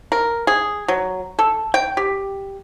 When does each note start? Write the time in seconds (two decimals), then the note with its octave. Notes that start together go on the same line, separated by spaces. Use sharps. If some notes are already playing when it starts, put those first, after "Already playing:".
0.12 A#4
0.47 G#4
0.88 F#3
1.39 A4
1.74 G5
1.97 G4